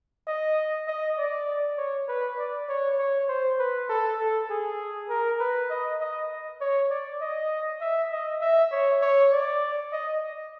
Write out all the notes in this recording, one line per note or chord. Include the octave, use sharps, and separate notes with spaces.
D#5
D#5
D5
C#5
B4
D5
C#5
C#5
C5
B4
A4
A4
G#4
A#4
B4
D#5
D#5
C#5
D5
D#5
E5
D#5
E5
C#5
C#5
D5
D#5